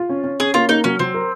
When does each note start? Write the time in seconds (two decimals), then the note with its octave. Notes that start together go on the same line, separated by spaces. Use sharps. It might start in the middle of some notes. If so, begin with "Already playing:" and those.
Already playing: F4
0.09 C#4
0.24 C#4
0.40 C#4 G#4
0.54 A#3 F4
0.69 A#3 D#4
0.84 F#3 C#4
0.99 F#3 C4
1.14 A#4